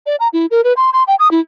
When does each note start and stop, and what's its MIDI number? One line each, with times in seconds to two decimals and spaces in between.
0.06 0.16 74
0.20 0.28 82
0.33 0.46 64
0.51 0.61 70
0.64 0.73 71
0.77 0.90 84
0.93 1.03 84
1.08 1.15 79
1.19 1.31 87
1.31 1.40 64